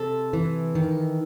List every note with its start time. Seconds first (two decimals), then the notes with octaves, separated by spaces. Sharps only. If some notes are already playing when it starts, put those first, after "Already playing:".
Already playing: C3 A4
0.33 E3
0.75 D#3